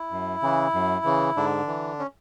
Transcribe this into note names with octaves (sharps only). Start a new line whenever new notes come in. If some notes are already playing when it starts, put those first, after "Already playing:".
Already playing: E4
F#2
C#3 E3
F#2
C#3 E3
G#2 D3 D4
E3
C#4